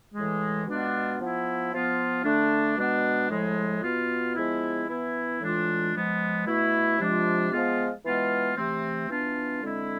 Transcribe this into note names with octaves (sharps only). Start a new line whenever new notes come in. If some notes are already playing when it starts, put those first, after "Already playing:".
A2 E3 G#3
B2 G#3 B3 D4 F4
F3 B3 E4
F3 B3 F4
D3 A3 D4
B2 G#3 B3 D4
A2 F3 G#3
B2 B3 F4
F3 G#3 B3 E4
E3 B3 E4
A2 E3 G#3 D4 F4
F3 G#3 B3
B2 A3 E4
C3 F3 G#3 D4 F4
F3 G#3 B3 F4
E3 G#3 B3 F4
C3 E3 A3 C4
E3 B3 D4 F4
D3 G#3 C4 E4